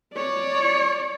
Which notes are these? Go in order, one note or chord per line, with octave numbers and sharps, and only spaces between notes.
C#5 D5